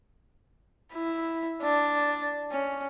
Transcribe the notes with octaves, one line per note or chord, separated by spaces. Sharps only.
E4
D4
C#4